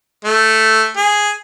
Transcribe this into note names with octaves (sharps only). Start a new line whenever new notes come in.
A3
G#4